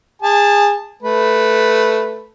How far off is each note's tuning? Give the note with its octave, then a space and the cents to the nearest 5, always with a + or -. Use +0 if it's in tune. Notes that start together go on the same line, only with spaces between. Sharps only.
G#4 -25 A5 +0
A3 +0 B4 +0